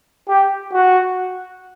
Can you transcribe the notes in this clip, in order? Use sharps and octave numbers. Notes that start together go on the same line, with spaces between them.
G4
F#4